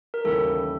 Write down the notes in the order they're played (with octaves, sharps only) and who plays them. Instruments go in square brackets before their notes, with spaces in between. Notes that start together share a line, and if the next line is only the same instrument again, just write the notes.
[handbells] A#4
[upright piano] D#2 C#3 E3 G3 [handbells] A4